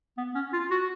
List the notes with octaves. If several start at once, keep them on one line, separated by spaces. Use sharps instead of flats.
B3
C#4
F4
F#4